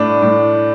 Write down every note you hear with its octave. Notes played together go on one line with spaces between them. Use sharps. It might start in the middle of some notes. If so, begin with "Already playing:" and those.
Already playing: A2 D4
A2